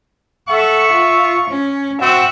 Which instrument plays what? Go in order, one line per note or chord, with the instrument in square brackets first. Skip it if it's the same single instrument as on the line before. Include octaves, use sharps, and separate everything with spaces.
[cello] A4 F#5 [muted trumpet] E5 [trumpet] C#6
[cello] F4
C#4
[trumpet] C4 [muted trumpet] F#4 [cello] E5 F#5